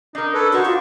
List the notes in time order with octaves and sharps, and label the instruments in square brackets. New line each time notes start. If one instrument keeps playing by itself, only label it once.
[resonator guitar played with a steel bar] D4 A#4 [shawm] D#4
[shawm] C#4 [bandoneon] A4 B4
[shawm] D#4 [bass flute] F#4 [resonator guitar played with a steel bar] C5 A5 [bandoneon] C#6
[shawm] D4 [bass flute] F4